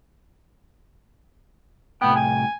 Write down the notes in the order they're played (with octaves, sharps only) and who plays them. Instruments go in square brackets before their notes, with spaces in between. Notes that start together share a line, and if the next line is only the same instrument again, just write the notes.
[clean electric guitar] C2 A2 G5 [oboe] B3
[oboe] G#5